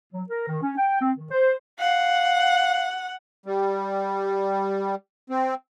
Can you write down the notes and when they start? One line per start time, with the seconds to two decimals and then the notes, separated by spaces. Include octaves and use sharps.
0.13 F#3
0.30 A#4
0.48 D#3
0.63 C#4
0.77 G5
1.01 C4
1.18 D#3
1.31 C5
1.79 F5 F#5
3.46 G3
5.30 C4